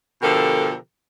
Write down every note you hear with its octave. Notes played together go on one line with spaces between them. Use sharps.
B2 D3 F3 G4 A4 A#4